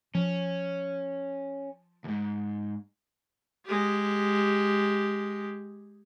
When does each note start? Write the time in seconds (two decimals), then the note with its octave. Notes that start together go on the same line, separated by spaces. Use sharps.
0.15 F3 C#4
2.04 D#2 G#2
3.66 G#3 G4